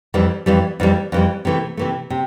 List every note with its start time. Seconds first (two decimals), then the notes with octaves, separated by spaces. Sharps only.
0.14 F2 E3 G3
0.46 F2 E3 G3
0.80 F2 E3 G3
1.12 F2 E3 G3
1.45 C3 E3 A3
1.77 C3 E3 A3
2.10 C3